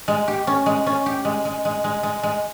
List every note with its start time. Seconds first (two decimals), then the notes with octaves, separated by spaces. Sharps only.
0.08 G#3
0.28 G4
0.47 C#4
0.66 G#3
0.87 C#4
1.06 G4
1.25 G#3
1.45 G#3
1.65 G#3
1.84 G#3
2.03 G#3
2.23 G#3